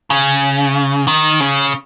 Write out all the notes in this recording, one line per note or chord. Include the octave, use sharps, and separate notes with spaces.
C#3
D#3
C#3